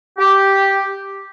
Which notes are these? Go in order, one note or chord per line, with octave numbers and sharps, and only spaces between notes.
G4